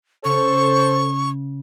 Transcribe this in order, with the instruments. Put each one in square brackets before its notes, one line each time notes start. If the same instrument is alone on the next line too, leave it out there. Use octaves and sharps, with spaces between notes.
[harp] C#3 [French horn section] A4 C5 [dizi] C#6